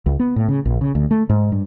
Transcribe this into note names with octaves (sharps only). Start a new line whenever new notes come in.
C#2
B3
A2
C#3
A#1
C#3
D2
A3
G#2
G2